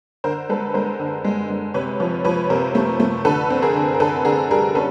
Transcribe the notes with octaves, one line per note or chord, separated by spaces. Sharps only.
D3 A#4 C5
G#3 A4 B4
G#3 A#4 C5
D3
G#3
G#3
C3 B4 C#5
F3 B4 C#5
F3 B4 C#5
C3 A#4 C5
A3
A3
D3 A4 B4
C4
G#4 A#4
D3
A#4
D3 A4 B4
D3 G#4 A#4
G3 G#4 A#4
C#4 A4 B4